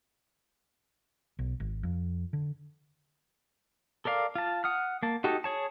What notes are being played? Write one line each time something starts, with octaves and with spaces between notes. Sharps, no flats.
B1
G#1
F2
D3
A4 A#4 D5 F5
F4 A5
F#5 D#6 F6
A#3 A5
D#4 F#4 G4 A4 D#5
G#4 C#5 A5